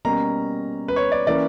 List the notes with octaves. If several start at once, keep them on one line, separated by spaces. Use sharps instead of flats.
B2 G3 A#3 C#4 A#5
B4
C#5
D5
E3 A#3 C#4 D5